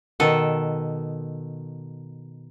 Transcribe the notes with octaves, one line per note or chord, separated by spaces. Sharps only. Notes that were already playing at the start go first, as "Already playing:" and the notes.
B2 D#3 A4